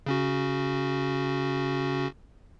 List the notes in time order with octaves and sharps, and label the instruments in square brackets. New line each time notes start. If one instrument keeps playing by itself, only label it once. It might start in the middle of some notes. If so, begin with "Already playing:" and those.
[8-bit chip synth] C#3 C#4 F#4